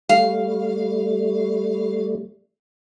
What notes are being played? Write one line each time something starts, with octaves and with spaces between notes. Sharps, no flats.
G3 A3 F5